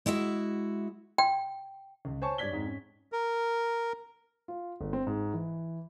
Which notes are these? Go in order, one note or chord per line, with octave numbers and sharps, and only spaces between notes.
G#3 E4 F#4 E5
G5
C#2
C5 C#5 G#5 A5 C#6
G2 C#5 D5 G#6 B6 G7
F2 G#2
C#4
A#4
F4
G1
C4
G#2
E3